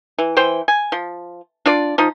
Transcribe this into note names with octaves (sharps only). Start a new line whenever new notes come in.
E3
E3 C5 G5
G#5
F3
D4 F4 D5
F3 D#4